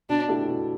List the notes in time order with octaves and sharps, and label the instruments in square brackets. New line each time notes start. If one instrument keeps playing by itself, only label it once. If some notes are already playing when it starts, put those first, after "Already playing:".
[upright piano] B2 [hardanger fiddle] D4
[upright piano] A3 E4 G4
B2